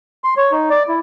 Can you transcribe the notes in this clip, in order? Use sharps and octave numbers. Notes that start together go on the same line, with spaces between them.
C6
C#5
D#4
D5
E4